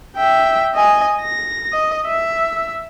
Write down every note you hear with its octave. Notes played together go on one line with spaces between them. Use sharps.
E5 G5
D#5 G#5
A#6
D#5
E5